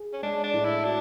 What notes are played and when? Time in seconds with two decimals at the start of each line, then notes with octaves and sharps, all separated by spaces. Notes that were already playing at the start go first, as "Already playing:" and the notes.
Already playing: G#4
0.13 C#4
0.23 G#3 D4
0.43 D4
0.53 A2
0.65 E4
0.84 D4 F#4